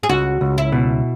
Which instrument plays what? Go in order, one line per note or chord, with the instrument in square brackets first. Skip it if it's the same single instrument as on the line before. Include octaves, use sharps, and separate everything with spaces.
[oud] G#4
[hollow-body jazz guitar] C#2 [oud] F#4
[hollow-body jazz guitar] C#2
[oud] E4
[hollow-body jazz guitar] B2